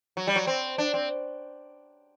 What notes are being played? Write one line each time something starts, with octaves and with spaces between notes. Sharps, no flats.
F#3
G3
F#3
C4
D4
C4